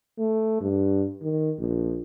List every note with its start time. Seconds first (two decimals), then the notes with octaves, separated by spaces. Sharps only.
0.19 A3
0.61 G2
1.22 D#3
1.59 A#1